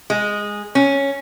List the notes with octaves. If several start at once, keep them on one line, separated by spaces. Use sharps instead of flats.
G#3
C#4